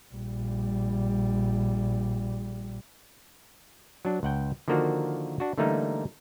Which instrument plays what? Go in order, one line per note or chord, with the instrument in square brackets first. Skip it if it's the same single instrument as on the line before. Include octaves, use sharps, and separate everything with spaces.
[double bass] A#1 G3
[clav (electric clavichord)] F#3 D4
C#2 F#5 G5
D3 D#3 F3 A#3 D4 F#4
D4 F#4
D3 E3 G3 A3 A#3 D#4